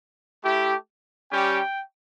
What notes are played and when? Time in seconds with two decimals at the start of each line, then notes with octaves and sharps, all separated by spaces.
0.44 A3 E4 G4
1.31 G3 C#4 G4 G5